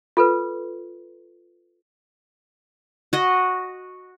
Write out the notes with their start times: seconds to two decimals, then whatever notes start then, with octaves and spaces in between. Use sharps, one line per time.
0.17 F4 A4 B4
3.13 F#4 D#5